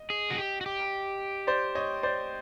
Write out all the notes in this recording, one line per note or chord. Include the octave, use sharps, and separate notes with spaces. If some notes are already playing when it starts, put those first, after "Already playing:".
Already playing: D#5
G#4
F#4
G4
F#4
G4
C5 D5
C#5 D#5
C5 D5